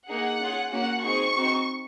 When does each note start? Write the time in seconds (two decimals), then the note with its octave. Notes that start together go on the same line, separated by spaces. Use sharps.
0.08 A#3 D#4 G#4 F#5
0.40 C#4 F4 G#4
0.72 A#3 C#4 F#4 F#5
1.04 C4 D#4 G#4 C#6
1.36 C4 D#4 F#4